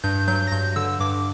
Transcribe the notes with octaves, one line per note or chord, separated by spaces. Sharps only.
G2 G6
F#3 G6
A#6
G2 G6
D3 E6
G2 D6